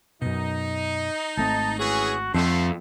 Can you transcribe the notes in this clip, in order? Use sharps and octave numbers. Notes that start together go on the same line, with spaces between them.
F#2 B2 D#4
G#1 A3 C4 A5
E3 C#4 F#4 G#4
F2 D3 A3 C6